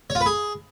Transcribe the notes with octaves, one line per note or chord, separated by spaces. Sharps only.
C#5
F4
B4
G#4